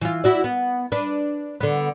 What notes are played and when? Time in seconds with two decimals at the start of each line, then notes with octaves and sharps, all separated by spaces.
0.01 E3 F4
0.24 E4 F#4 D5
0.44 B3
0.92 D4 B4
1.60 D3 B3